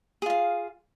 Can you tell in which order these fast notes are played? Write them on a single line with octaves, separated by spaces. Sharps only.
G#4 F4 F5